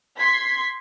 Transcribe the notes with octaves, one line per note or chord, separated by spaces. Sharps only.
C6 G#6 B6 C7